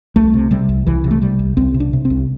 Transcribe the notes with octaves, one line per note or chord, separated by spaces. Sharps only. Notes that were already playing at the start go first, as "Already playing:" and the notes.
C2 A3
C3
C3 G3
C2
C2 E3
C3
A3
C3 G3
C2
C2 C4
C3
D4
C3
C4
C2